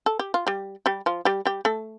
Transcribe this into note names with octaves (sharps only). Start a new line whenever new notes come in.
A4
G4
F4
G3 G4
G3 G4
F3 F4
G3 G4
G3 G4
A3 A4